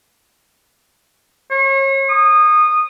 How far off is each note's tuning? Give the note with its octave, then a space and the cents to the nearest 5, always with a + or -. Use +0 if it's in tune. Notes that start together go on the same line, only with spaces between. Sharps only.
C#5 -35
D#6 -20